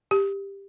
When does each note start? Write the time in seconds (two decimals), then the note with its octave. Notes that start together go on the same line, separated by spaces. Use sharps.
0.11 G4